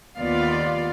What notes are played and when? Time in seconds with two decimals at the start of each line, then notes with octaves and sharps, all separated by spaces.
0.19 D#2 B3 F4 D5 F5